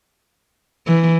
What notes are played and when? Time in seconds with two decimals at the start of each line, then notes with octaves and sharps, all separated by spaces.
0.87 E3